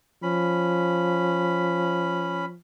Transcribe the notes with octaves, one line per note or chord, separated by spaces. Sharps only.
F3 C#4 B5